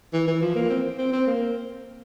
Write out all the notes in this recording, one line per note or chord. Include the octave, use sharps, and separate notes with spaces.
E3
E3
F3
A#3
C4
C4
C4
A#3